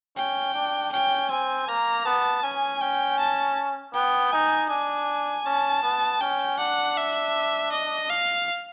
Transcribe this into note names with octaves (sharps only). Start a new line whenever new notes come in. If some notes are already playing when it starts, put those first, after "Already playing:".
C#4 G5
D4
C#4 G5
C4 G#5
A#3 A#5
B3 A5
C#4 G#5
C#4 G5
A5
B3 G5
D#4 G#5
D4 G#5
C#4 A5
B3
C#4 G5
D4 F#5
E5
D#5
F5